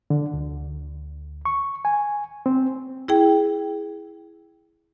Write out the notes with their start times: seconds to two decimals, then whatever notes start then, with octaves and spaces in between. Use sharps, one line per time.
0.10 D3
0.34 D2
1.45 C#6
1.85 G#5
2.46 C4
3.08 E4 G#4 G5